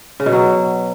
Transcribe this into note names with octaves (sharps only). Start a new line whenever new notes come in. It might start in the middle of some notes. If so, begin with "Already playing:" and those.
C#3
B2
F#3